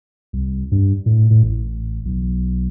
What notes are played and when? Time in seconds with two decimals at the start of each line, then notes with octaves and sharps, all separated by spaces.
0.33 C2
0.71 G2
1.06 A2
1.30 A2
1.43 A1
2.05 B1